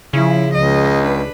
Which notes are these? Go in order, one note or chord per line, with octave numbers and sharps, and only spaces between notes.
C#3 F3 E4
C#2 D#5
D4 B4